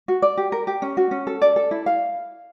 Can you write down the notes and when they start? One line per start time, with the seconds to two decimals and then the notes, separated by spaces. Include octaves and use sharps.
0.08 F#4
0.22 D5
0.37 G4
0.52 A#4
0.67 G4
0.82 C#4
0.97 F#4
1.11 C#4
1.27 A4
1.42 D5
1.56 A4
1.71 E4
1.86 F5